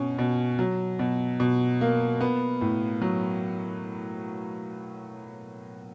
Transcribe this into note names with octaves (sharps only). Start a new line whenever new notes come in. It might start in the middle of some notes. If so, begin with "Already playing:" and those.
Already playing: B2 C#4
B2
F#3
B2
B2
A#3
B3
A2
F#3